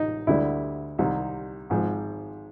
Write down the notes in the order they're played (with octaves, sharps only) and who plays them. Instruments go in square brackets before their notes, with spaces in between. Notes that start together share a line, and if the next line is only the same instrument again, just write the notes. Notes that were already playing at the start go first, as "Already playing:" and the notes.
Already playing: [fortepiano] A1 D#4
D2 D3 G3 E4
C2 C3 D#3
G#1 G#2 F3